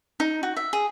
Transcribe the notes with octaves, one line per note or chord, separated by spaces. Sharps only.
D#4
F#4
E5
G#4